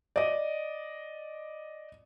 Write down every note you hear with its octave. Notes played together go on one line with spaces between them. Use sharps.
D5 D#5